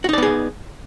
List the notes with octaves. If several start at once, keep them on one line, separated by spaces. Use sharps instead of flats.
B3 D#4 F#4 G#4 D5